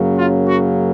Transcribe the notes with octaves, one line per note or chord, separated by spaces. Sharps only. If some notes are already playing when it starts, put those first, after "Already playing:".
Already playing: F#2 C#3 F#3 A#3
F4
F#4